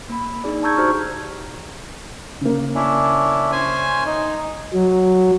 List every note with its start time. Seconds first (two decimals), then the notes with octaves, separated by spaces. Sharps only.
0.10 A#3 B5
0.44 D4 D#4 G#4 D5
0.63 A5 A#5 C#6 E6 G6 G#6
0.77 D#4 F#4 G4 C5 C#6 F6
2.41 C#3 A#3
2.75 C#4 D4 E4
3.52 C#4 C5 G#5
4.06 D#4
4.74 F#3